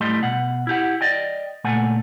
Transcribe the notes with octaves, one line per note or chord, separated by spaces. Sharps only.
F#2 A2 G3 A3 D#5 C6
B2 F#5
E4 G4 F#5
D5 D#5 G5
C#2 A#2 A3 A4 F#5 G#5